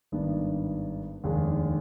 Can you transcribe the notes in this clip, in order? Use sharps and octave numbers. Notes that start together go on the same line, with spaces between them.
G#1 G2 D#3 B3 D4
F1 D#2 D#3 G#3 D4